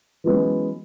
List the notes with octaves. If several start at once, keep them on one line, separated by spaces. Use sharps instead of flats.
E3 F#3 G#3 B3 C#4